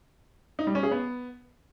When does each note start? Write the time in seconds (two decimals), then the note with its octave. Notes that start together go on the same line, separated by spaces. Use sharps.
0.59 D#4
0.67 G3
0.75 C#4
0.83 G#4
0.91 B3